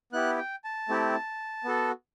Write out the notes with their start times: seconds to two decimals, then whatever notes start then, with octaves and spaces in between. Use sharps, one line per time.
0.13 B3 E4 G4 F#6
0.38 G5
0.64 A5
0.89 A3 C4 E4 G4
1.64 B3 F#4 A4